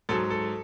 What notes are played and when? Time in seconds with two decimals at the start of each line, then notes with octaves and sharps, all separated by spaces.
0.09 G#2 F#3 A4
0.30 A4